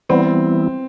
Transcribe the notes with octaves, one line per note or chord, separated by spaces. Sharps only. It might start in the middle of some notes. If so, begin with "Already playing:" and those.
E3 G3 B3 C4 E4